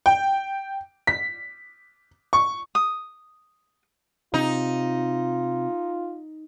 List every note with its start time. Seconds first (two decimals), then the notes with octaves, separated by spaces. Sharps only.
0.06 G5
1.07 B6
2.33 C#6
2.75 D#6
4.34 C3 D#4 F4